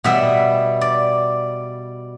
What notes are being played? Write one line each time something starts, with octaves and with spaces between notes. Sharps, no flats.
B2 G3 B3 E5
D5